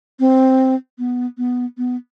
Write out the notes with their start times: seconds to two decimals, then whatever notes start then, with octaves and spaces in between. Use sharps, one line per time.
0.20 C4
0.99 B3
1.38 B3
1.78 B3